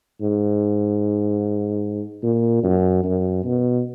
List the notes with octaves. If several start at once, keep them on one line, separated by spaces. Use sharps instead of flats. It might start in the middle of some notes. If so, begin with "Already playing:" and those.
G#2
A#2
F#2
F#2
B2